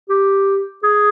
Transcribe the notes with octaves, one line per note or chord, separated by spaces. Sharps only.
G4
G#4